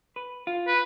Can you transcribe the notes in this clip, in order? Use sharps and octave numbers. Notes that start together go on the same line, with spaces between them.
B4
F4
B4